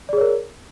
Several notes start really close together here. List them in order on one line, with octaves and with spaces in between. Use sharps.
D5 G#4 C#5 A#4